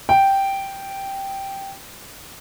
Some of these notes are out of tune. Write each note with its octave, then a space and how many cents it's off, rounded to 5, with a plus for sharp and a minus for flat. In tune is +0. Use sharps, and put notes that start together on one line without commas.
G5 -5